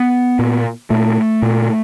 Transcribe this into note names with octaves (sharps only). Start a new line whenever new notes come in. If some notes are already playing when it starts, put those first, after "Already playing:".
Already playing: B3
A#2
A#2 A3
A#2